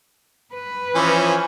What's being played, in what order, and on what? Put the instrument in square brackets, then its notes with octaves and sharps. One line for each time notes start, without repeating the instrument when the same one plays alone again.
[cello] B4
[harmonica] E3 F3 C#4